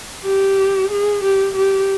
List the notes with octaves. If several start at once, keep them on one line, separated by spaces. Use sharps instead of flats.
G4
G#4
G4
G4